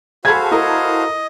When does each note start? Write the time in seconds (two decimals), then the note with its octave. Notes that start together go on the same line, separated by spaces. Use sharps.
0.25 F#4 G#4 A4 C5 F5 B5 G#6
0.51 E4 A4 A#4 D#5